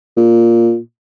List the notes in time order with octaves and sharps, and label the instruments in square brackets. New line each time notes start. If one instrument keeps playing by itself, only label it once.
[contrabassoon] A#2